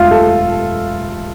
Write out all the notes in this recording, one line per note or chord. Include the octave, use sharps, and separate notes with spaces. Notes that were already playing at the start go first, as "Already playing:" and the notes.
Already playing: E1 A3 F4 E5
A4